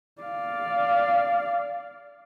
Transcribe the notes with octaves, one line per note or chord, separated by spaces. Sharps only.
D5 F5